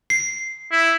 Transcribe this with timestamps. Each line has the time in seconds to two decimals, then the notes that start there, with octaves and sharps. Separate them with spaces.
0.10 C7
0.72 E4